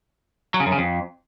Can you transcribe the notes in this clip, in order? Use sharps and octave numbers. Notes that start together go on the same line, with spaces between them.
F#3
C#3
F#2
C#3
F2